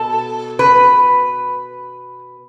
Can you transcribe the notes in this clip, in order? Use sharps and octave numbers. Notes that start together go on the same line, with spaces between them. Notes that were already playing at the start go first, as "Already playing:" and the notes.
Already playing: B2 A4
B4